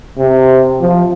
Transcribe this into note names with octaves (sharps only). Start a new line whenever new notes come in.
C3
F3